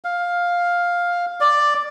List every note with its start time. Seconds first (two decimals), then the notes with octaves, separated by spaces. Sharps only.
0.04 F5
1.40 D5